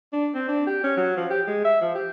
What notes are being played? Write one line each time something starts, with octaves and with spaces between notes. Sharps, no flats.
D4
C4
D4
G4
C#4
F#3
F3
G4
G#3
E5
F3
G4